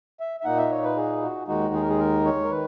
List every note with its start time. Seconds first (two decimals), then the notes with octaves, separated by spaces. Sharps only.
0.20 E5
0.40 E5
0.45 A#2 A#3 D#4 F#5
0.58 E5
0.71 C#5
0.84 B4
0.96 G#4
1.22 F#4
1.48 D#2 D#3 G#3 D#4 F#4
1.74 G#4
1.82 A#4
1.89 G#4
1.99 A#4
2.25 C#5
2.44 A#4
2.51 D#3 B4